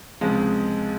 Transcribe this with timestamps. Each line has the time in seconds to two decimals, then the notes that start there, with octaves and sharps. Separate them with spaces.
0.21 C#2 C3 F3 G#3